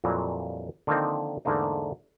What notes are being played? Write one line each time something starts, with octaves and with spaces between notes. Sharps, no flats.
F2 A#2 E3 F#3 G3
D3 D#3 F3 A#3 C4 D#4
E2 G#2 D3 A3 A#3 D#4